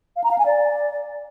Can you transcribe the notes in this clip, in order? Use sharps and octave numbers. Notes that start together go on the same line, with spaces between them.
F5
A#5
F5
G#5
D5